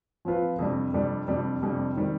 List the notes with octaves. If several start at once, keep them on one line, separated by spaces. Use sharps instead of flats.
F3 C4 F4 B4
F2 C3 G3 D4
F2 C3 G3 D4
F2 C3 G3 D4
F2 C3 G3 D4
D#3 G3 C4